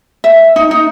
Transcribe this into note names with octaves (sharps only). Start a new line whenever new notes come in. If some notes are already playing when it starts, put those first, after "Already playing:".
E5
D#4
D#4